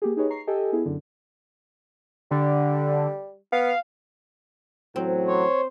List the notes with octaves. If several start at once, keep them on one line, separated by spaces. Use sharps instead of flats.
A#3 G4 G#4
D#4 G4 G#4 B4 C#5 D#5
A#5 C#6 C7
G4 A4 D#5 G5 G#5
B3 E4 G#4
F#2 D3
D3 G3
B3 F5
A1 A2 F#3 C4
C5 C#5